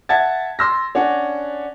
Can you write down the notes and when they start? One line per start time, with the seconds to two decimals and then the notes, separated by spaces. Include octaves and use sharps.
0.09 E5 F#5 A5 G#6 A6
0.59 C6 E6 A#6
0.95 C#4 D4 F#5